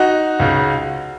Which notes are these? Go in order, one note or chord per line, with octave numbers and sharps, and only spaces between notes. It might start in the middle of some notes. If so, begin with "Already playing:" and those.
Already playing: D#4 F#4
C#2 C#3